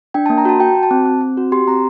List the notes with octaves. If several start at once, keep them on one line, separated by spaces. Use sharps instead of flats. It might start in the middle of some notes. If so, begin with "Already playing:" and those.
D4 G5
A5
A#3
A#5
F#4 A5
F#4 G5
F#4
A5
C4
C4
C4
F#4
G4 C6
C4 A#5